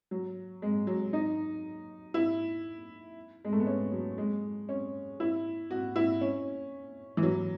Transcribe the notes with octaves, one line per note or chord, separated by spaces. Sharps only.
F#3
G#3
F#3
D#4
E4
G#3
A3
B3
C#4
F#3
G#3
C#4
E4
F#4
E4
C#4
E3
F#3